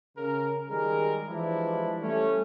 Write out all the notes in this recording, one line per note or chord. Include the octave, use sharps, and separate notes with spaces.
C#3 A#4
D#3 G3 G#3 G#4 A#4
E3 F3 G3 G#3 D4 E4
G3 A3 C#4